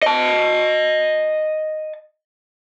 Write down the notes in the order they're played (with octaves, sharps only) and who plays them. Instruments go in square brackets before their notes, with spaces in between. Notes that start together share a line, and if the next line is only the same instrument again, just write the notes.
[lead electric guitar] D#5 A5